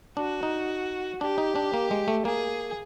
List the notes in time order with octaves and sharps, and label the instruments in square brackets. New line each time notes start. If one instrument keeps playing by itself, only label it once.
[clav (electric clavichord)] D4 [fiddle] F#4
[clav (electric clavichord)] D#4
[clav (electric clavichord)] D4 [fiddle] G4
[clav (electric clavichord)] D#4
D4
A#3
G#3
A3
[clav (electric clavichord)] A#3 [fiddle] G#4